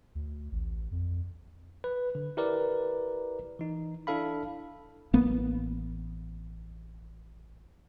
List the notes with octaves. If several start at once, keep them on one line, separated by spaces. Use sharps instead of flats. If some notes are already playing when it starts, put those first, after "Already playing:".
D2
A1
F2
B4
D3
E4 G4 A#4 B4 D5
E3 D#4
D4 E4 A4 F5 B5
A1 A#3 B3